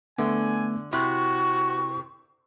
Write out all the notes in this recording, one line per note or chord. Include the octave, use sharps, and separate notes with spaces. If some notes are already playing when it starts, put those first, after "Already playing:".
D3 A3 B3 G#5
C3 E4 F#4 C#6 F#6